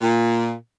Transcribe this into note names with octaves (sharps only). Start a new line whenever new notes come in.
A#2